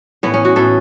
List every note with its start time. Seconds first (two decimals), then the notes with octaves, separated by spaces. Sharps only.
0.23 A2 E3 B3
0.34 C#4
0.45 F#4
0.56 A2 E3 A4